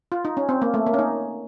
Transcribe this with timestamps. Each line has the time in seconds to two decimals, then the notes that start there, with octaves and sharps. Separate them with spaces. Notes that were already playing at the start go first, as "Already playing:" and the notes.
0.12 F4
0.25 D#4
0.37 C#4
0.49 C4
0.62 A#3
0.74 A3
0.87 A#3
0.94 C#4
0.99 D#4